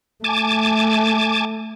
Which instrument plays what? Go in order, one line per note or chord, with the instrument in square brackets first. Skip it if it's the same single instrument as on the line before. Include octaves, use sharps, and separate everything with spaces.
[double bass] A3 [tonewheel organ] G#5 A5 D6